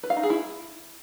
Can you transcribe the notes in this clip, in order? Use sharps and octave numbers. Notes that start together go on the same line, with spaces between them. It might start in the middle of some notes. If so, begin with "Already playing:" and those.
B4
F5
D#4
G#4
E4